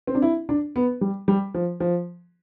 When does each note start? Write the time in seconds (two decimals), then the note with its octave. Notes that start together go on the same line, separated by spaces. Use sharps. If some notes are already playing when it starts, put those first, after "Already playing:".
0.07 C4
0.15 D4
0.22 E4
0.49 D4
0.76 B3
1.01 G3
1.28 G3
1.54 F3
1.80 F3